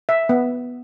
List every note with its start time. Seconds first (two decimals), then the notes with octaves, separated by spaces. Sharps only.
0.09 E5
0.29 B3